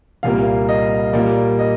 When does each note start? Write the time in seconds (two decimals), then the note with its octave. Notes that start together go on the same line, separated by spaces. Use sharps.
0.23 C2 A#2 G3 A#3 F5
0.69 D#5
1.13 A#2 G3 A#3 D5
1.59 D#5